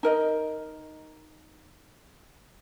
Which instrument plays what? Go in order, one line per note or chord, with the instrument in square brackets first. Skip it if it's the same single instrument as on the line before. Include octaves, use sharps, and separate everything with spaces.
[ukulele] D#4 A#4 D#5